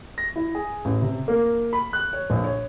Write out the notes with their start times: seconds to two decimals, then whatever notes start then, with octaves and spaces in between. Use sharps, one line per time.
0.18 A#6
0.36 E4
0.55 G#4
0.85 A1
1.02 C3
1.28 A#3
1.73 B5
1.93 F#6
2.13 C#5
2.30 A#1
2.44 C#5